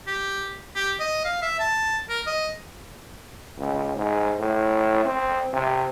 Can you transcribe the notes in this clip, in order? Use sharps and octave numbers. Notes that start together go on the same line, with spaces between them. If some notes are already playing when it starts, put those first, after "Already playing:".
G4
G4
D#5
F5
E5
A5
A#4
D#5
C#2
G#2
A2
C4
C3